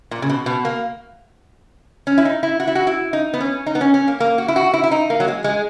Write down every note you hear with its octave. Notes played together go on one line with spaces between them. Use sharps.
A#2
C#3
B2
B2
A#3
C#4
E4
D#4
E4
F#4
E4
F#4
E4
D#4
B3
C#4
D#4
B3
C#4
C#4
A#3
A#3
F#4
E4
F#4
E4
E4
D#4
A#3
F#3
G#3
G#3